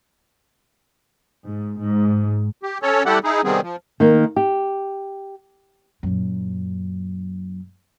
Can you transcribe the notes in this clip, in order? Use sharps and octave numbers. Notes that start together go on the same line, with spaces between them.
G#2
G#2
G4
C#4 A4 C#5
G3 A3 E4 G4 A4 F#5
D#4 E4 G#4
C3 D#3 G3 B3 C4 G#4
F3
D#3 A#3
G4
F#2 A#2